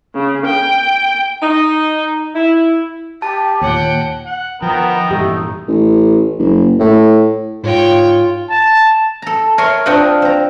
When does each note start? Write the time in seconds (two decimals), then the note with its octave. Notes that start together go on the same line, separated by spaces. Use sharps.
0.14 C#3
0.45 G5
1.42 D#4
2.35 E4
3.22 G4 A5
3.61 D#2 A#2 C#5 F#5 G5
4.26 F#5
4.62 F3 B3 A#4 G5 A#5
5.10 G2 A#2 E3 A3 D#4 G4
5.68 A1
6.39 F#1
6.79 A2
7.64 G#2 F4 C#5 G5
8.50 A5
9.22 A4 A#5
9.58 A#4 C#5 E5 G#5 A#5 C6
9.86 C4 D4 F4 G4 D#5 F#5
10.22 C4 A#5